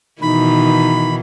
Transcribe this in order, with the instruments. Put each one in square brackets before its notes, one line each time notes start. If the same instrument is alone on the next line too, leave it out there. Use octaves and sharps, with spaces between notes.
[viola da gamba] B2 D#3 E3 [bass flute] D#4 [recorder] B5